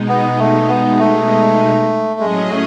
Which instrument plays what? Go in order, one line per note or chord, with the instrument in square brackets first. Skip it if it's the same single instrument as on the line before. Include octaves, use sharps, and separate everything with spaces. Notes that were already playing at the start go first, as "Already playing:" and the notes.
Already playing: [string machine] B2 G#3 D#4
[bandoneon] B3
A3
B3
A3
[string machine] A2 F#3 C#4 G#4 D#5 [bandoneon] G#3
[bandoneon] A3